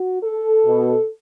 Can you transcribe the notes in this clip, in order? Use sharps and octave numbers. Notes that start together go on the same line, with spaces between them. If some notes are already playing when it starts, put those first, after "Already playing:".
Already playing: F#4
A4
B2